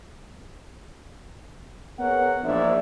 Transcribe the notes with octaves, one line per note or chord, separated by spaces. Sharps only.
B3 G#4 A#4 C#5 F#5
A#1 E2 G#2 D4 D5 E5